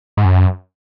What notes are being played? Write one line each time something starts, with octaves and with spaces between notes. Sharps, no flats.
G#2
F#2